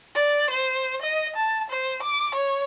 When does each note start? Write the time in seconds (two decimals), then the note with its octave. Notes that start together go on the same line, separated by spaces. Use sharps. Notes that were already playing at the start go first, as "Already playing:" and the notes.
0.16 D5
0.50 C5
1.02 D#5
1.36 A5
1.70 C5
2.03 D6
2.34 C#5